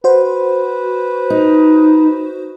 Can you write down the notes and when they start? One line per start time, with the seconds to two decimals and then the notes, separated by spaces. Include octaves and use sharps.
0.04 F#4 B4 C5
1.30 D#4